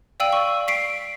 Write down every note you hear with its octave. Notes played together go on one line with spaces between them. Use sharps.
D5 F5 G5 E6 D#7 F#7
C#6
B6 C7 D7